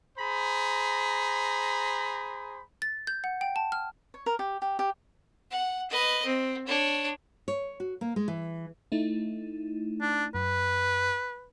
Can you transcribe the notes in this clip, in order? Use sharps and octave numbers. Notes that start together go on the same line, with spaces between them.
G#4 C5 A#5 B5
A6
G6
F#5
G5
A5
F6
C#5
A#4
G4
G4
G4
F#5
B4 D#5
C4
D4 C#5
C#5
F#4
A#3
G#3
E3
A3 D#4 E4
D4
F#2 B4